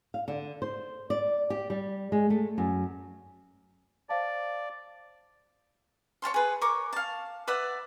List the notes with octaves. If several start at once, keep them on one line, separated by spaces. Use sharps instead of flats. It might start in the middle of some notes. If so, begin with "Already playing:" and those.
F5
D3
C5
D5
G4
G3
G#3
A3
F#2
C5 D5 F5 A5
C#5 F5 A5 C6
G#4 B4
A#4 C#5 C#6 D6
F5 A5
B4 D5 E5 F#5